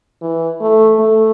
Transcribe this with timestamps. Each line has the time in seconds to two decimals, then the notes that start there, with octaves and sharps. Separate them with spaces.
0.22 E3
0.61 A3
1.00 A3